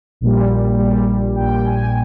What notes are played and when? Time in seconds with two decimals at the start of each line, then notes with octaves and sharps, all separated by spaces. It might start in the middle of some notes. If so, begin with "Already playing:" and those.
0.21 A#1 A#2 G3
0.78 A#1 A#2 G3
1.36 A#1 A#2 G3 G5
1.65 G#5